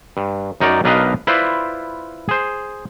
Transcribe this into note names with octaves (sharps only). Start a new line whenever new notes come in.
G2
F#2 D#4 A#4 C#5 D5
B1 D4 A#4 B4 D#5 F5
E4 F4 B4 C5 D5
G#4 C5